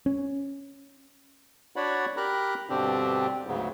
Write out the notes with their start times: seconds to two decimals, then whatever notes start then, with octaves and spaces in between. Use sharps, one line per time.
0.06 C#4
1.76 D4 F#4 C#5 D5 F#5 B5
2.17 G4 A#4 A#5 B5 F#6
2.70 G2 B2 D3 C4 D4 G4
3.47 D2 G#2 C#3 F#3 B3